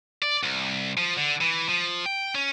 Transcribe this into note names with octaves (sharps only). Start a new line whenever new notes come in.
D5
C2
F3
D3
E3
F3
G5
C#4